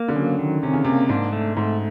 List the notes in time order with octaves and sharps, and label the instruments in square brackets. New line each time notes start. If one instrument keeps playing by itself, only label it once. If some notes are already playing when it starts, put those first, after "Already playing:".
Already playing: [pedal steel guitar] A#3
[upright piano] D3
[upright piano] C#3 [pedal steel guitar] F#3
[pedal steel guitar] D#3
[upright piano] C3 [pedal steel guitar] C#4
[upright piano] C#3
[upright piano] C3 [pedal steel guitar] A#3
[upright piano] G#2 [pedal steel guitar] D4
[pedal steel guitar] A3
[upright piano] G#2 [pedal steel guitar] A3